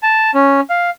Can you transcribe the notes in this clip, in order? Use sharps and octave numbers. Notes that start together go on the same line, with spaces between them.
A5
C#4
F5